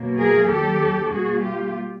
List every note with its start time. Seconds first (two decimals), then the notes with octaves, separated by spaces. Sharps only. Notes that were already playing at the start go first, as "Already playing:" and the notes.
Already playing: B2 F#3 A#3
0.19 G#4 A#4
0.50 D#2 D#3 F#3 G4 A4
1.12 B2 G3 A#3 F#4 G#4
1.42 F4 G4